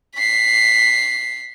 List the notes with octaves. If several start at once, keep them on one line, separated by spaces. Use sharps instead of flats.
B6 C7